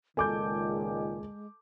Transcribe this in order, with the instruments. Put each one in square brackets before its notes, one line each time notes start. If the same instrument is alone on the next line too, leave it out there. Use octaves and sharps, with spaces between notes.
[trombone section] C#2 A#2 D#3 [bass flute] G#3 [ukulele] A4 [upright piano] G#5 D6 G6